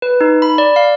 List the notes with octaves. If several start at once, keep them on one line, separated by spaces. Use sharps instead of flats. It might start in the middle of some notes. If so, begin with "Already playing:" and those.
B4
D#4
B5
D5
F5